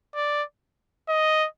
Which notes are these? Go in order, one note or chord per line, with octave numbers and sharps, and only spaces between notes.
D5
D#5